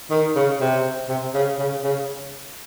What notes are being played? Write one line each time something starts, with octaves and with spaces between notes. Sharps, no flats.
D#3
C#3
C3
C3
C#3
C#3
C#3